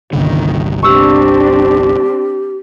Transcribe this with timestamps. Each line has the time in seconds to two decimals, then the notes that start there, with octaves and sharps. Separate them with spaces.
0.13 G1 C2 D3 D#3
0.83 C4 D4 G4 C#6 E6